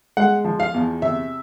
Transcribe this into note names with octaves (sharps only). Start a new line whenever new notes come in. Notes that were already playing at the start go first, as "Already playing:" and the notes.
G#3 F#5
F3
F5
E2
C3 E5